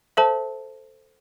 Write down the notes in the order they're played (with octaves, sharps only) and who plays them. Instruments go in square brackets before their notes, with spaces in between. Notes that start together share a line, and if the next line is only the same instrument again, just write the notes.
[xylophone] A4 C5 E5 A5